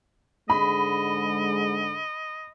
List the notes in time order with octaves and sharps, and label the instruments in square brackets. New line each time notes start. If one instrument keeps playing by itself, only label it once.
[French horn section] G#2 D3 G#3 [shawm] D#5 [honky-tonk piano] B5